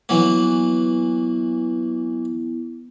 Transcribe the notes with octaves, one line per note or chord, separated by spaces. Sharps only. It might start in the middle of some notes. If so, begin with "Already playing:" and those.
E3 F#3 A#3 B3 E4